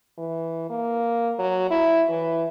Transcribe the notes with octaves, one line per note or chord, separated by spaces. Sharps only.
E3
A#3
F#3
E4
E3